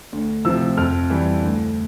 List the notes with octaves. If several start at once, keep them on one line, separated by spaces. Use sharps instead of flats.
D2
C3 F3 E6
F2 F6
E3 G3
D2